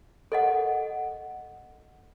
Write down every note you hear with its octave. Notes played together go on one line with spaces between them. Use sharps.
A4 D#5 F#5